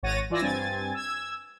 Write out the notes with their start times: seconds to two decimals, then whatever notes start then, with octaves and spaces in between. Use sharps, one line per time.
0.03 G#1 C#5 F#5 A6 A#6 D#7
0.30 E3 F4 D5 G#5 E6 A#6
0.41 G2 C4 G#5 G#6 A6
0.94 E6 G#6